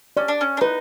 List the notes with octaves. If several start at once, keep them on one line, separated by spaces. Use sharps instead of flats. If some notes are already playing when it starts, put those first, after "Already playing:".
C#4 D5
D4
C#4
D4
D#4 B4